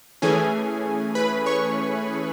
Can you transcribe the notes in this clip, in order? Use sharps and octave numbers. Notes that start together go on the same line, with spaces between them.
E3 A3 C#4 G#4 G#5
B4 B5
C#5 C#6